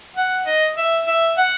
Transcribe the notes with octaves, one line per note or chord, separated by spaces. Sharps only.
F#5
D#5
E5
E5
F#5